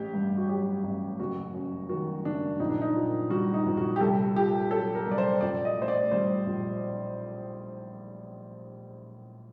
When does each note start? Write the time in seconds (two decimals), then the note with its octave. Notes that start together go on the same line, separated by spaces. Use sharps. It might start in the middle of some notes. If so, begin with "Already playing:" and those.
Already playing: A1 G4
0.14 G2
0.37 F#4
0.48 F#3 G4
0.84 A1
1.19 F#1 F#4
1.54 F#2
1.89 D#3 F#4
2.25 F#1 D4
2.60 A#1 D#4
2.70 D4
2.81 D#4
2.95 A#2
3.30 G3 F#4
3.54 D#4
3.66 A#1
3.77 F#4
3.96 G4
4.00 C2 A4
4.36 A#2 G4
4.70 F#3 A4
4.95 A#4
5.06 C2
5.11 D5
5.18 C5
5.41 A#1 D5
5.65 D#5
5.77 A2 C5
5.88 D5
6.11 G3 C5
6.46 A#1